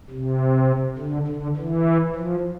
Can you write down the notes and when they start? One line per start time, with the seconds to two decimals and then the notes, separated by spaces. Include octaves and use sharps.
0.11 C3
0.98 D3
1.27 D3
1.57 E3
2.15 F3